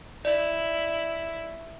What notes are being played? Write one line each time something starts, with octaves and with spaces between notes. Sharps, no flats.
E4 D5